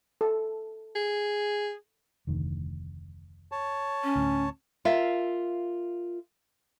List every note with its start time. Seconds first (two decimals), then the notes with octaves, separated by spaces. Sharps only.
0.21 A4
0.96 G#4
2.27 F1 D2 D#3
3.52 C#5 A5
4.03 C#4
4.16 D2 A2
4.85 F4 A#4 E5 F5